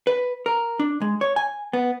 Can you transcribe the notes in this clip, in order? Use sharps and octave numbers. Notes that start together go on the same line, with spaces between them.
B4
A#4
D4
G#3
C#5
G#5
B3